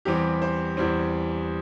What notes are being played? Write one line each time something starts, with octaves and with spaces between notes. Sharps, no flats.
E2 E3 G3 C4 G4
C5
E2 E3 G3 C4